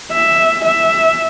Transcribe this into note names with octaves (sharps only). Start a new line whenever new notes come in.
E5
E5